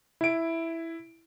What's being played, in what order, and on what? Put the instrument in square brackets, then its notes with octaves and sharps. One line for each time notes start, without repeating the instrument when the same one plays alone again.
[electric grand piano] E4 D7